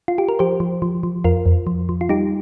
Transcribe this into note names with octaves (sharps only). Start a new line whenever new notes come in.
F4
G4
A#4
F3 G4 C5
F3
F3
F3
F2 F4 A#4
F2
F3
F3
F4
G3 D#4 G4